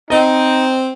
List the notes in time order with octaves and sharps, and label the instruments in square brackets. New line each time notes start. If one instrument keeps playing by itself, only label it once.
[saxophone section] C4 [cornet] D#4 [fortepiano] D#5